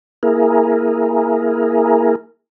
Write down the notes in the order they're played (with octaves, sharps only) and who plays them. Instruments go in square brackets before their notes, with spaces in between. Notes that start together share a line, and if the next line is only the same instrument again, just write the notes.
[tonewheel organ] A#3 E4 G#4 A#4